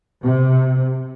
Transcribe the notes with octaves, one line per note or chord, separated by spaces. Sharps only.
C3